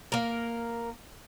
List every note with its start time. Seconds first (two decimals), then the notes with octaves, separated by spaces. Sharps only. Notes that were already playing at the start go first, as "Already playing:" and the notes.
0.12 A#3 A#4